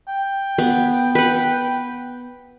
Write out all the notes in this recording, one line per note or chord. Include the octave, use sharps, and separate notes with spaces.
G5
B3
B4 F#5